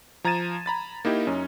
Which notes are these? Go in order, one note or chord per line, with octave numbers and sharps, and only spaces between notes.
F3 A#5 G#6 A6 D#7 E7
A#5 B5 A6
A#3 D#4 E4 G4
F#2 C#4 D#4